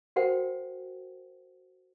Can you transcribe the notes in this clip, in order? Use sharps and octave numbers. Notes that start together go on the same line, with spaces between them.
F#4 A#4 C5 F#5 G5